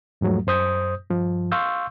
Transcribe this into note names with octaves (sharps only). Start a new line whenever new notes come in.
E2 G#2 F3 F#3 A3
F#2 C5 D#6 G6
G2 F3
F5 C6 C#6 E6 G6